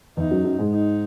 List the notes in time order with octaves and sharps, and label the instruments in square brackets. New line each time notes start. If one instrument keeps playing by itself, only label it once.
[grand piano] E2 E3 [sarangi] D#4
[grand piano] F#2 F#3
F#2 F#3
G#2 G#3
[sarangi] D#4